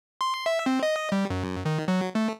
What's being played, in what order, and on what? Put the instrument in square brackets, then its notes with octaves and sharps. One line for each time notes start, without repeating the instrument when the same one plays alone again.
[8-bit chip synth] C6
E5
C4
D#5
G3
F#2
D#3
F#3
A3